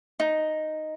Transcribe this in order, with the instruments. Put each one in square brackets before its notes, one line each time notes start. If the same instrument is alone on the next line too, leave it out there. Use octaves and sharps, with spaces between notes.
[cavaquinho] D#4